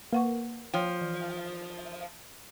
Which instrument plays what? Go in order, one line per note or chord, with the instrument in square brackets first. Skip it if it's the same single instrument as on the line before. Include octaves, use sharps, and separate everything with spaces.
[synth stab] A#3 [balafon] B4 F#5 C#6
[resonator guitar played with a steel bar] F3 [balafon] C#5 G5
[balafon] E3